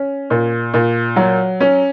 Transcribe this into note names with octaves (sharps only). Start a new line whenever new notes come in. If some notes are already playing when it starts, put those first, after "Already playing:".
Already playing: C#4
A#2
A#2
F#3
C#4